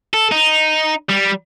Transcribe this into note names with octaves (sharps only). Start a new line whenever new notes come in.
A4
D#4
G3